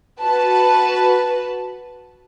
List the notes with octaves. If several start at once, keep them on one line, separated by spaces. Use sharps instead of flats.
F#4 B4 A5